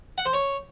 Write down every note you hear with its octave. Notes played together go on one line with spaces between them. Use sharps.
F#5
C5
C#5